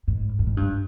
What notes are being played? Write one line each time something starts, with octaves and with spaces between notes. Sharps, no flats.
G#2
G2
G#2
G2